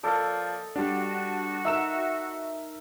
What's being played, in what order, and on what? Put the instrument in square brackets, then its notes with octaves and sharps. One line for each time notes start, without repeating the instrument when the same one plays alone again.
[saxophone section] F3 A#3 D5 [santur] A4 D#5
[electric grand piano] G3 D4 [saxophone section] F#4
[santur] D#4 A#4 [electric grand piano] E5 E6 E7